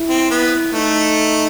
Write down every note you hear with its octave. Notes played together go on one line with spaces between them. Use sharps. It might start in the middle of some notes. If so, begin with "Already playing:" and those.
Already playing: E4
C4
B3
A3 D#4